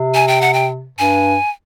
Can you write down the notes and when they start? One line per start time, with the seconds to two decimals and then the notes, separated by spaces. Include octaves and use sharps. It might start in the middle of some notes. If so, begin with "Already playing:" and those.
Already playing: C3
0.15 G#5
0.28 G5
0.41 F#5
0.54 G5
0.99 G2 G#5